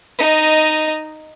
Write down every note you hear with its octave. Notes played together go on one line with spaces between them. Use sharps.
D#4 D#5